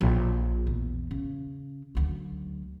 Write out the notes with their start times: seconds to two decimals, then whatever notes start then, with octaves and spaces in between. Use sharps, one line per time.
0.01 A#1
0.67 E2
1.11 C#3
1.95 D2 F#3